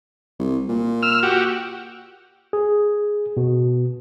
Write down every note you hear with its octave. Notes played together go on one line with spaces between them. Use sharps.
C2
A#2
E6 F6
F#4 G4
G#4
B2